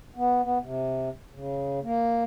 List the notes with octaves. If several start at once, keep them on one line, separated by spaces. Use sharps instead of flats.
B3
B3
C3
C#3
A#3